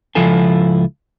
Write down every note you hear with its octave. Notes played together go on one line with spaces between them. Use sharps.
C#2 F3 E4 F4 A4 G#5